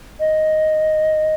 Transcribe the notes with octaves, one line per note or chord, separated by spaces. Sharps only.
D#5